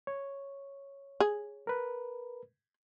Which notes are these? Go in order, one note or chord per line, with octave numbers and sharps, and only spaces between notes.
C#5
G#4
A#4 B4